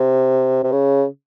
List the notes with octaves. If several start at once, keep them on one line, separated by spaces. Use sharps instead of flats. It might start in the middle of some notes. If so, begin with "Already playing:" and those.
Already playing: C3
C3
C#3